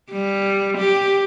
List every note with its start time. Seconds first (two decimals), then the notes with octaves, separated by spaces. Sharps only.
0.12 G3
0.78 G4